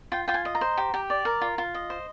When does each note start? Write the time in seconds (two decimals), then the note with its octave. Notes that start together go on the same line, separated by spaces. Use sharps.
0.12 F4 G5
0.28 F4 G5
0.34 G#5
0.45 D#5
0.55 A#5
0.61 C5
0.77 G4
0.94 G4
1.10 D5
1.25 A#4
1.41 F4
1.58 F4
1.74 D#5
1.90 C5